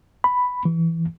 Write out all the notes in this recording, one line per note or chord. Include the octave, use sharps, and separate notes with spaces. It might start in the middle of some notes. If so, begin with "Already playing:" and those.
B5
E3